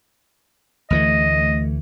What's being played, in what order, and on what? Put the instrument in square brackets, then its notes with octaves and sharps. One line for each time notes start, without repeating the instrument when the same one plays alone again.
[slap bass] D2 E3 A3 [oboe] D#5